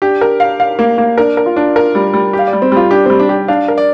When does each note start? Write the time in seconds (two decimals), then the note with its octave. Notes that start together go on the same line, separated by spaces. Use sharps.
0.02 D4 G4
0.21 A#4
0.40 F5
0.60 F5
0.79 A#3
0.98 A#3
1.18 D4 A#4
1.37 A#4
1.46 F4
1.56 D4
1.76 A#4
1.95 G3
2.13 G3
2.33 G4
2.39 F5
2.47 D5
2.53 G3
2.62 C4
2.72 G3 F4
2.91 D4 G4
3.06 G3 C4
3.20 D4
3.29 G4
3.48 D4 F5
3.68 A#4
3.78 D5